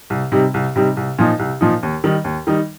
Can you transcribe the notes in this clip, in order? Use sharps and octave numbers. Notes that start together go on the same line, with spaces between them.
C2
C3 G3 D#4
C2
C3 G3 D#4
C2
A#2 F3 D#4
C2
A#2 F3 D#4
D#2
D#3 G3 D#4
D#2
D#3 G3 D#4